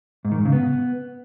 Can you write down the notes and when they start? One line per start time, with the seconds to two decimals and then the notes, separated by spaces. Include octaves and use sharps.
0.25 G#2
0.32 D#3
0.38 G#2
0.45 C#3
0.52 B3